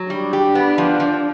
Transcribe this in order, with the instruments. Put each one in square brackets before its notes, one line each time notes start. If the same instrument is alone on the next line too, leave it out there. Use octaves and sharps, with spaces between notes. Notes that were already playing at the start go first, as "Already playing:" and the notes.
Already playing: [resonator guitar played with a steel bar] F#3
[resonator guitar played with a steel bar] G3 [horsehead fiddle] D4
[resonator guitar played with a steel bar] G4
B3
F3
F3